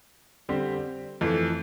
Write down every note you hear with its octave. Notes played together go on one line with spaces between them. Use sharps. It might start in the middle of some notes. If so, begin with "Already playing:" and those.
D3 G3 C4 G4 C5
F2 E3 A3